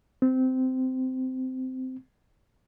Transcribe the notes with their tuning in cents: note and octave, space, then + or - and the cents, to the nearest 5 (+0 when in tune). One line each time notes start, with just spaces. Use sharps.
C4 -15